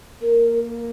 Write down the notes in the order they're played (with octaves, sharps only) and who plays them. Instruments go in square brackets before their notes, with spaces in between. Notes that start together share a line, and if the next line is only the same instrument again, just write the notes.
[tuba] A#3 [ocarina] A#4